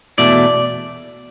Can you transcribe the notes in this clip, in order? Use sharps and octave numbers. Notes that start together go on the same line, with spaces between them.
E2 B2 A3 E4 D5